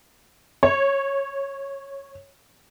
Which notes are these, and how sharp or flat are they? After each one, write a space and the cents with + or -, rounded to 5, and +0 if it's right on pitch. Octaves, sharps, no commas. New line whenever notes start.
C#5 -10